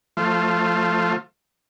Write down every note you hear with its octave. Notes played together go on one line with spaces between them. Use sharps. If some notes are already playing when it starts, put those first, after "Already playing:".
F3 A3 F4